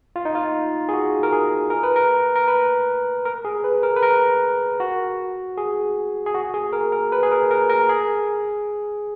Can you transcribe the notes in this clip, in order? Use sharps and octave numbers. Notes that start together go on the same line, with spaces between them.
F4
D#4
F4
G#4
F#4
A#4
G#4
A#4
B4
A#4
A#4
B4
A#4
G#4
B4
A#4
B4
A#4
F#4
G#4
G#4
F#4
G#4
A#4
A#4
B4
G#4
A#4
A#4
A#4
G#4